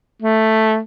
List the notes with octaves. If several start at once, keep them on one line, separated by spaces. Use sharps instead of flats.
A3